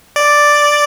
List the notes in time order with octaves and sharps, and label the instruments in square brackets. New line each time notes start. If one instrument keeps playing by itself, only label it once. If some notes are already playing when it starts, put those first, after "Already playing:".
[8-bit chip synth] D5